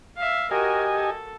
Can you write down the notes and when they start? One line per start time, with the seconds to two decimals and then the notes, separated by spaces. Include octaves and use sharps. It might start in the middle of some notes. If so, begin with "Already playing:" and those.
0.17 E5 F5
0.51 F#4 G4 A#4 D#5 G#5
0.93 A4